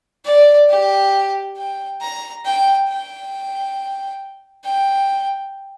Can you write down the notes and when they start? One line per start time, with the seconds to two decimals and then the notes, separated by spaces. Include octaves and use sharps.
0.25 D5
0.69 G4
1.57 G5
2.01 A#5
2.45 G5
2.89 G5
4.64 G5